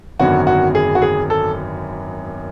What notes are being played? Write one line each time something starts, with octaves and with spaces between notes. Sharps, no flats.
G#1 F#2 D3 F#3 B3 F#4
F#4
G#4
F#4
G#4
A4